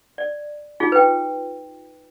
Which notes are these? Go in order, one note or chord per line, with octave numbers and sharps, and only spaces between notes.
D5
D#4 F4 G#4
B4 G5